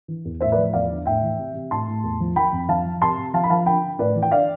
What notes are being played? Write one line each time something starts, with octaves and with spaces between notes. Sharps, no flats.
E3
E2
A2 C5 E5
B4 D5
F3
E2 D5 F5
D3
A2 E5 G5
E3
C3
C3
A2 A5 C6
A2
E2
F3
F3 G5 B5
F2
F3 F5 A5
F3
C3 A5 C6
C3
F3 F5 A5
B5
F3 F5 A5
D3 G5 B5
D3
A2 B4 D5
E3
G5
D3 D5 F5